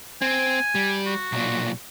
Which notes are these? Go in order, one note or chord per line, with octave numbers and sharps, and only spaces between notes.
C4 G#5
G3
F#4
B1 A#2